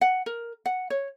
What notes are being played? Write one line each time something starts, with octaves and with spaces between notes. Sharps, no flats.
F#5
A#4
F#5
C#5